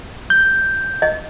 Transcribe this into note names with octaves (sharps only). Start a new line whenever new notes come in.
G6
D#5